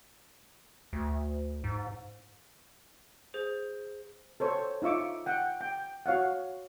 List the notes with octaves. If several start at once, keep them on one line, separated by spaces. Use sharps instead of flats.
D2
G#2
G#4 C5
A4 C5 C#5
D#4 F4 E5 C#6 D6
F#5 G5
G5
F#4 C#5 F5 F#5